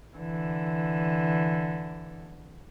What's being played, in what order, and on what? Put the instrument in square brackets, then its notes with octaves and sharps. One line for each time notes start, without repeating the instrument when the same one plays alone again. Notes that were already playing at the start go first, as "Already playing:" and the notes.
[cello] D3 E3